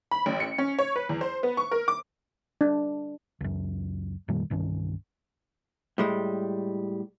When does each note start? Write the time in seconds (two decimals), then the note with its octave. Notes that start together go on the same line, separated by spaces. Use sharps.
0.11 B5
0.26 A1
0.40 C#7
0.58 C#4
0.79 C#5
0.96 B4
1.09 E2
1.21 C5
1.43 B3
1.57 C#6
1.71 A#4
1.88 D6
2.61 D4
3.41 C#2 F#2
4.28 F2 A#2 D#3 G3
4.50 C2 G2 D#3 C#4
5.98 A2 G3 G#3